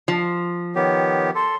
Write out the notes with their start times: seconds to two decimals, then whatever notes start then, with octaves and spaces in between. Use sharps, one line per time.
0.08 F3
0.75 D#3 B3 G4 C#5
1.35 A4 C6